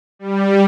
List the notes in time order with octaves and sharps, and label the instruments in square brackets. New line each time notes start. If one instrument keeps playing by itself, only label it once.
[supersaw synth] G3